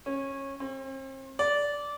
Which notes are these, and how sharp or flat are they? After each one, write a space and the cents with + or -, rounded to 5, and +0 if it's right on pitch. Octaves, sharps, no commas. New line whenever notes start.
C#4 -20
C4 +40
D5 -15